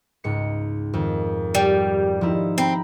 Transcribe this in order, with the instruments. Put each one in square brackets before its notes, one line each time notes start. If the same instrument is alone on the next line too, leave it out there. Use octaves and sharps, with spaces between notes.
[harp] C#2 G#2 C#7
F2 D#3
[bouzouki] G3
[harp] F3 D#4 E4
[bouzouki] C4 [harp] G5 A#5 B5